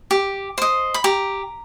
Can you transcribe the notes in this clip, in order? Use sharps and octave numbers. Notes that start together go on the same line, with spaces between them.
G4
C5 D#5
B5
G4 A#5